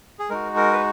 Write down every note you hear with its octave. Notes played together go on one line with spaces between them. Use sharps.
G#4
G#3 D#4 F#4 A#4
A#4
B4